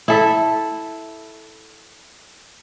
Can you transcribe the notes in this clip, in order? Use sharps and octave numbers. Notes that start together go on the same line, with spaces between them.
E4 A4 E5